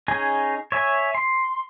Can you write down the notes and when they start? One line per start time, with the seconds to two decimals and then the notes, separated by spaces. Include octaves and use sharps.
0.08 C#4 D#4 G#4 G#5
0.72 C#5 E5 G#5
1.15 C6